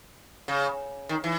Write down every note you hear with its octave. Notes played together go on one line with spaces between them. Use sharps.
C#3
D#3
E3